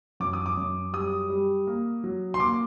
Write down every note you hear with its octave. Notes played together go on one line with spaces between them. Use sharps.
F#2 D6
D#6
D6
F#2
G3 D#6
G3
A#3
F#3
C6
A#3 D6